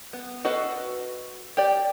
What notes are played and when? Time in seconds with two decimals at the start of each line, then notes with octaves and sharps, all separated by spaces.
0.13 B3
0.45 F#4 A4 B4 D#5 F5
1.57 G4 D5